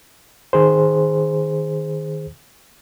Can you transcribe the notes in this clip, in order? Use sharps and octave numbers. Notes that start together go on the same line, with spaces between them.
D#3 G#4 C5